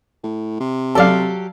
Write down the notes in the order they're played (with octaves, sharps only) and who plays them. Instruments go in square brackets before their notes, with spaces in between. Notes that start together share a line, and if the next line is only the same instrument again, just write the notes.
[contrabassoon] A2
C3
[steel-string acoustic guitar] F#3 G4 [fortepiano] A4 D5 F5